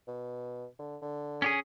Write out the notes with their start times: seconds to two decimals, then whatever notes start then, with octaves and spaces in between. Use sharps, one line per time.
0.08 B2
0.79 D3
1.02 D3
1.42 C#4 G4 G#4